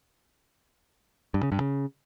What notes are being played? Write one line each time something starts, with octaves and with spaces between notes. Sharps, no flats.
G2
C#3
G2
C#3